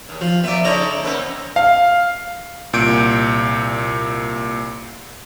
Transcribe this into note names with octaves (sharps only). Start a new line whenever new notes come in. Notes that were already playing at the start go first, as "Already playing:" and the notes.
D#2
F3 F4
F3 B3 D5 E5
C#3 D#4 A4 C#5 D5 A#5
A#3 C4 C#4
F5
C2 A#2 G6 D7